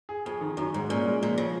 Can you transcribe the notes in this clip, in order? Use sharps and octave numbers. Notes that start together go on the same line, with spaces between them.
G#4
F2 G#4
D#3
F#2 D#3
G#2 G#3
A#2 C#4
G#3
A#2 F3
C#3 F3